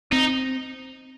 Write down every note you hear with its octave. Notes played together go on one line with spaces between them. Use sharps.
C4 D#4